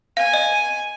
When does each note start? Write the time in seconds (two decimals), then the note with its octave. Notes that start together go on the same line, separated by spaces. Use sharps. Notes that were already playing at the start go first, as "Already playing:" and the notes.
0.17 F5 G#5
0.34 D#5